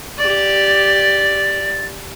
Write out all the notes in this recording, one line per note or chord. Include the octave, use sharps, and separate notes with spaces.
G4 D5 A6